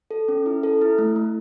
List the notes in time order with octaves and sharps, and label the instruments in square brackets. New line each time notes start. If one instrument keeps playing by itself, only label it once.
[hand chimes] A4
C#4
E4
A4
E4
A3
A3